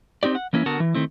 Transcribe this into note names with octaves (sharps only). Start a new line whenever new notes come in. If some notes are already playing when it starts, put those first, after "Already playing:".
C4 D#4 G4 D5
F#5
E3 A#3 C#4 D#4 E4
D3 B3 F#4 A#4 F#5 A5
E3
D#3 A3 C4 E4